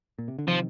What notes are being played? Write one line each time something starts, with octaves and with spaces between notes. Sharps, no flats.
A#2
C3
D3
C3 D#3 F3